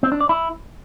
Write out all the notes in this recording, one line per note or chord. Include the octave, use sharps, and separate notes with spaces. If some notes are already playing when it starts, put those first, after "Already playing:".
C4
D4
D5
E4